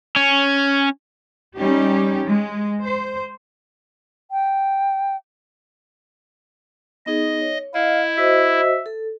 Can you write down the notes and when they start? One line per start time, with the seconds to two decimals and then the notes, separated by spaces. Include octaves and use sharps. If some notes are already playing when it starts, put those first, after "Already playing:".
0.16 C#4
1.59 G3 C#4 D#4 G4
2.26 G#3
2.84 C5
4.31 G5
7.06 B3 D#4 G#4 D#5
7.41 C#5
7.74 E4 D#5 F5
8.18 F#4 C5 D#5 E5
8.86 A4